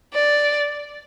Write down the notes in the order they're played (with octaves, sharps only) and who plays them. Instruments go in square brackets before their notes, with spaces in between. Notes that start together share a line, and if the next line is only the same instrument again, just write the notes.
[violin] D5